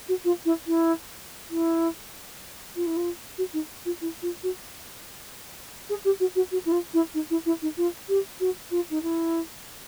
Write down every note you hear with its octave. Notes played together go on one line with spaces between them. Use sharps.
F#4
F4
E4
E4
E4
F4
E4
F4
F#4
D#4
F4
E4
F4
F#4
G#4
G4
F#4
F#4
F#4
E4
F4
E4
D#4
E4
E4
D#4
F4
G4
F#4
F4
D#4
E4